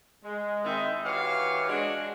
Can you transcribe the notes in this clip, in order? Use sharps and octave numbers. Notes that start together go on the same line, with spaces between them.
G#3
D#3 G#3 C4 D#4 E4 E5
E3 F#4 G4 C#5 E5 F5
G#3 D4 F#4